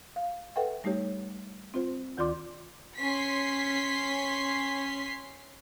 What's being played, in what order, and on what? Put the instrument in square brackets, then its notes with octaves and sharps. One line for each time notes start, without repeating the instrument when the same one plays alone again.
[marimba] F5
A4 B4 E5 F#5 G5
G3 A3 D#4 G4 C#5
C4 F4 C5
D2 D#3 F4 D5 C6 D6
[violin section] C#4 C6 B6 C7